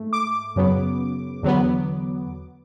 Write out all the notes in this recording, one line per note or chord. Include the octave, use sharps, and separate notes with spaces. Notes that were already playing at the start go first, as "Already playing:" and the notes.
Already playing: G#2 A3
D6
F#2 C#3 F#3 B3
E2 D3 F#3 B3